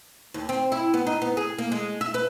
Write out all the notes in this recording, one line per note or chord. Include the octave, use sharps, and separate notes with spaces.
D#2
C4
E4
B3
D#4
B3
G#4
A#3
G#3
E5
B4